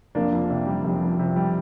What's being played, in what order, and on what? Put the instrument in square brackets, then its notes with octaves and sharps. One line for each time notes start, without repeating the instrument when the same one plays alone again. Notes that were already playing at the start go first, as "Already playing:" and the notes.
[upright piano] F1 [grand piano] A#3 D4
[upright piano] F2
C3
G3
F1
F2
C3
G3